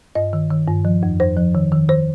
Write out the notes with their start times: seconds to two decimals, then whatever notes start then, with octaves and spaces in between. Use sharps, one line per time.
0.15 G2 D#5
0.33 D#3
0.50 D#3
0.68 G2
0.85 F3
1.03 F2
1.20 F2 C5
1.37 F3
1.55 D#3
1.72 D#3
1.89 D#3 C5